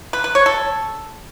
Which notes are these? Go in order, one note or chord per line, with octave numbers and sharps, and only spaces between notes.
B4
B4
C#5
A4